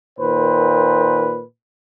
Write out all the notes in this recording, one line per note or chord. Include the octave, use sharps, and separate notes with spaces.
A#2 D#3 B4 C5